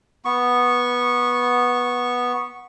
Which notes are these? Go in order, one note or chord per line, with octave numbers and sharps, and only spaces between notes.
B3 C#6